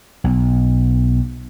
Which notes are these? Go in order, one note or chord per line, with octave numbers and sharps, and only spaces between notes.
B1